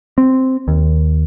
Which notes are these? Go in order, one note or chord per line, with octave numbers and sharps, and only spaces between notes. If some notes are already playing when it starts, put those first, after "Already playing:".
C4
D#2